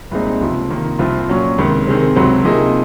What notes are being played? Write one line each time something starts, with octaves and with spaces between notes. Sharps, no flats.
C2 A#2 G#3 C4 D#4
C#2 C3 F3
C3 D#3 A#3
C2 C3 F3 C4 F4
A#2 F#3 C#4
C#2 C3 D#3
C3 D#3 G#3 C4
C#2 C3 F#3 C4
C3 F3 A#3 D#4 G#4